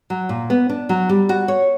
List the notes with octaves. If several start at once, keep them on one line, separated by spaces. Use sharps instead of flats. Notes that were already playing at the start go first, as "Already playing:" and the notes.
F#3
A#2
B3
D4
F#3
G3
F#4
C#5